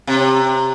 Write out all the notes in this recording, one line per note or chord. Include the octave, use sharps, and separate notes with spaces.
C3